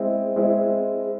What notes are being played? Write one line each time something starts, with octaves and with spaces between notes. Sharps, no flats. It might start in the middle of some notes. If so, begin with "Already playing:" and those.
Already playing: G#3 C4 E4
G#3 C4 E4